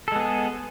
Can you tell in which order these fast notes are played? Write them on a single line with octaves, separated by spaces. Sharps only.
A4 G#3 B3 G#4